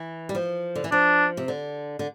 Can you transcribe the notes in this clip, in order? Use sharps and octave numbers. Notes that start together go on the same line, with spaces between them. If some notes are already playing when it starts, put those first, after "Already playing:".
Already playing: E3
G3
F3
D3
E3
F3 D4
C3
D3
D3